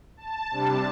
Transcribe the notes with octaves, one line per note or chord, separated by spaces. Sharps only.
A5
C3 G3 D4